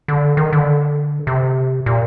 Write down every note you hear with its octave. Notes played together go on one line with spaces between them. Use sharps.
D3
D#3
D3
C3
A#2